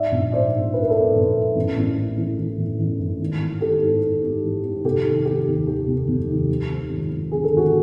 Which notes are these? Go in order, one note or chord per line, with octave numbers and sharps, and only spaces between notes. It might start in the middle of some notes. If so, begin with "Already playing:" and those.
Already playing: G#2 D5 E5
A#1
G#2 C5 D5
G#2
G#2 B4
A#4
A4 B4
G#2
A#1
G#2
A1
A1
A1
E3
E3
A1
A1
A1
G#1
E3
G#1 G4 A4
G#2
G#2
G#2
E3
G#2
F1 G4 A4
D#3
D#3 G4
D#2
D#3 G4
F1
F1
D#2
F3
F3
G#1
G#1
D3 G#4
A4
G#1 F#4 G#4